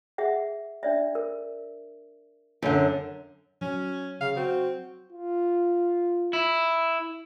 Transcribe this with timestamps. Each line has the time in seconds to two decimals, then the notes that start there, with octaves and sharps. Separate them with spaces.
0.18 G#4 E5 F#5
0.83 D4 D5 E5
1.15 A#4
2.63 F#2 D3 C#5
3.61 F#3 C#4
4.21 C#3 F5
4.36 C4 F#4
5.12 F4
6.33 E4